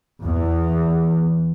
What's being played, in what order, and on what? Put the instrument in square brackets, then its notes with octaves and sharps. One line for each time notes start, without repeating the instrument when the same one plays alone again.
[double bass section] E2